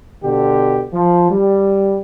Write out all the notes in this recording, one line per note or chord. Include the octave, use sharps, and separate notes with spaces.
B2 D3 G4
F3
G3